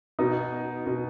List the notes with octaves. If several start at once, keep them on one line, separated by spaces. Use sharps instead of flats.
B2 D#4
B2